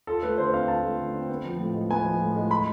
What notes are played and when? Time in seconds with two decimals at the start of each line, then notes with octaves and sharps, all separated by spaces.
0.07 F4 A4
0.23 A3 B4
0.38 D3 C5
0.53 C4 F5
0.68 F4 A5
0.83 A3
0.99 D3
1.14 C4
1.29 B3
1.45 F3
1.59 A2
1.74 G#3
1.90 B3 G#5
2.05 F3
2.21 A2
2.36 G#3
2.51 B5